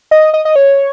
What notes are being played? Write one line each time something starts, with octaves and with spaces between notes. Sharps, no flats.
D#5
D#5
D#5
C#5